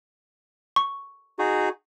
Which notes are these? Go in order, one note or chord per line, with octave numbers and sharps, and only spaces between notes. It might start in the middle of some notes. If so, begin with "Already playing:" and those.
C#6
D#4 F#4 G#4